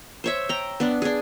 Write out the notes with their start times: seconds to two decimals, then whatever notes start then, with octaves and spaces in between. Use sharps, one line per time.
0.24 C5 C#5 E5
0.49 G5 A#5
0.80 B3 D4
1.02 D4 G#4